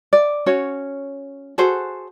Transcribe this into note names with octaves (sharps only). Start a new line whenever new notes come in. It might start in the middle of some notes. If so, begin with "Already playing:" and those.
D5
C#4 F#4 C#5
F#4 G#4 A4 C5